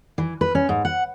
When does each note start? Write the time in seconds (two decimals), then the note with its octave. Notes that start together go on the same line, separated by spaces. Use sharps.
0.18 E3
0.41 B4
0.55 C#4
0.69 G#2
0.85 F#5